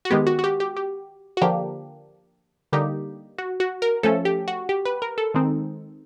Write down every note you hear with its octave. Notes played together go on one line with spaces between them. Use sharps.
F#4
D#3 G#3 B3 G4
F#4
F#4
G4
G4
G4
F#4
D3 F3 A#3 D4 G4
D3 G3 A#3 D#4 G4
F#4
F#4
A#4
F3 A3 C#4 A4
G4
F#4
G4
B4
A#4
A4
D#3 G#3 C4 D#4